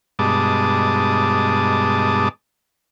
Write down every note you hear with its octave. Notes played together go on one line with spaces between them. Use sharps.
G2 B2 G#3 A5 D6 D#6